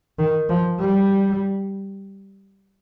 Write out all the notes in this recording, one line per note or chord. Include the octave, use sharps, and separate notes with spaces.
D#3
F3
G3